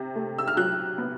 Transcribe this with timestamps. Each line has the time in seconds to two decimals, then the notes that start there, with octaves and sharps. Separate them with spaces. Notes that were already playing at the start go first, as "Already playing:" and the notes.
Already playing: C3
0.16 A3
0.38 E6
0.48 F6
0.57 F#3 F#6
0.98 B3